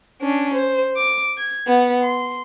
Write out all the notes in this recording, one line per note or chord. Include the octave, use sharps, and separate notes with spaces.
C#4 D4
C5
D6
G#6
B3 F#5
C6